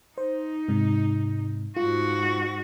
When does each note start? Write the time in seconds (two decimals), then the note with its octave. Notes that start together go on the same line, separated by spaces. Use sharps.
0.18 D#4 C5
0.68 G#2 C3
1.76 G#2 F4 F#4